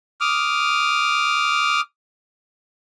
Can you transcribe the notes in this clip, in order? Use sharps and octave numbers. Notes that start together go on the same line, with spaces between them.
D6 D#6 F6